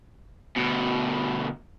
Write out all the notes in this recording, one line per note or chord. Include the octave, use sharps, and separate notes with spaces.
D2 B2